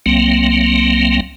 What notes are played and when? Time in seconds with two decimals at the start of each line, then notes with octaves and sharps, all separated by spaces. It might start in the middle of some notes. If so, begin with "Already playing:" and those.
0.06 C2 F#3 A#3 C4